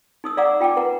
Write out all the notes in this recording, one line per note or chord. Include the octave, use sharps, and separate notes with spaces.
D#4 D#6 E6
D5 F5 F#5 A#5 D6 E6
F4 G5 A5 D6
B4 F#5 A#5